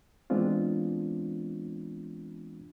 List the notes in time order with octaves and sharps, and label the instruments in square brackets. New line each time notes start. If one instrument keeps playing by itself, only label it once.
[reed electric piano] E3 G#3 B3 C4 D4 F4